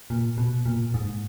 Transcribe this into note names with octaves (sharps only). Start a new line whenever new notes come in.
A#2
B2
A#2
G#2